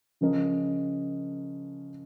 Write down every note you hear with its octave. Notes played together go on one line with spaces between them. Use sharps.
C#3 F3 C#4 A#4 D#5